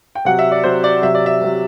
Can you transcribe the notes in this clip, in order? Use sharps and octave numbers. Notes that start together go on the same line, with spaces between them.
G5
C3 F#3 F#5
E5
D5
C3 F#3 C5
D5
C3 F#3 E5
D5
E5
C3 F#3